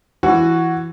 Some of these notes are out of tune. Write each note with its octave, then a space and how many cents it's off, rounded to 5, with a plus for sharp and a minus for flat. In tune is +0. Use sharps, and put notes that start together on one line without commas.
E3 +15 F#4 +0